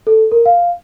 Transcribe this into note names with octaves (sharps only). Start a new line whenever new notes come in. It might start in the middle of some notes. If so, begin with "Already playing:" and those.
A4
A#4
F5